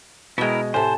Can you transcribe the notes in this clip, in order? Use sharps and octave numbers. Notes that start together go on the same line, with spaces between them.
B2 G#3 E4 A#4 E5 G5
A2 C3 C5 G#5 A5